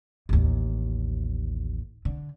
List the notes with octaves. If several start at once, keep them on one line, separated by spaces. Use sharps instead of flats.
A1 D#2
D3